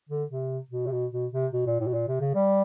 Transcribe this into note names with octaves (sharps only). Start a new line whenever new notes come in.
D3
C3
B2
C3
B2
B2
C3
B2
A#2
A2
B2
A#2
C3
C#3
G3